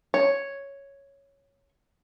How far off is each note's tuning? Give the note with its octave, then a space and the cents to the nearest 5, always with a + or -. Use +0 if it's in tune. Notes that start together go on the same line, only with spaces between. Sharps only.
C#5 +0